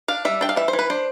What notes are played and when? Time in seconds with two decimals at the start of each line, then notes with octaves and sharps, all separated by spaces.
0.08 D4 F5
0.25 G3 E5
0.41 D4 G5
0.49 F5
0.56 E3 E5
0.68 C5
0.73 E3
0.79 B4
0.90 D4 C5